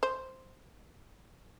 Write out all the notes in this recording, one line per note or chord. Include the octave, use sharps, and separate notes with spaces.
C5